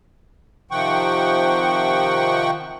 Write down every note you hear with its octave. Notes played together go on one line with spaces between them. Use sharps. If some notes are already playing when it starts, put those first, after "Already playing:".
C3 D#3 F3 F#5 G5 C#6